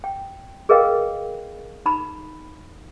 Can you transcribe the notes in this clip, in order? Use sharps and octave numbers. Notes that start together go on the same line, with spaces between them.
G5
G#4 A#4 B4 D#5 F5 G5
D#4 A#5 B5